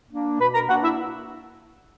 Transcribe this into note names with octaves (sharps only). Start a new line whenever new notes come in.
A#3 D4
B2 B4 B5
A#4 A#5
A#3 D4 F#4 F#5
E4 E5